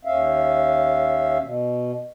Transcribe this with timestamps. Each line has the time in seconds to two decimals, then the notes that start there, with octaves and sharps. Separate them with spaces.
0.05 D#2 C#4 E5 F5
1.42 B2